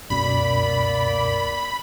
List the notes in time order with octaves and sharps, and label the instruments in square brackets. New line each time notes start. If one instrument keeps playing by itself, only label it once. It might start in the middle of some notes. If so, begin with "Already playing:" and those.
[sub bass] C#2 [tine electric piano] F#2 B2 [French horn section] A#3 D5 [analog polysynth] B5